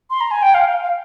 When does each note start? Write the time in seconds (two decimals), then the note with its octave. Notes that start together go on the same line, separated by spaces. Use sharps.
0.10 C6
0.21 A#5
0.31 G#5
0.42 G5
0.54 F5
0.68 F5
0.82 F5